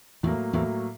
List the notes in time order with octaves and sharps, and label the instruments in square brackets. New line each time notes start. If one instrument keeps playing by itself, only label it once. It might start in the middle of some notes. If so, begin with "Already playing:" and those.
[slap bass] E2 E3 [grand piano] A2 F#3 A#3
[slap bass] E2 E3 [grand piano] A2 F#3 A#3